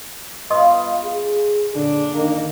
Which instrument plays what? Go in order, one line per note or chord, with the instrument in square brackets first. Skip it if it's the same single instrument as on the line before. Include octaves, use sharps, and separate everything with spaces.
[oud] B3 F4 F5 [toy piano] D#5 C6 D#6
[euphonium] G#4
[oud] F#2 A#2 [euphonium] D3 [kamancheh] D4
[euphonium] D#3 [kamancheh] A#3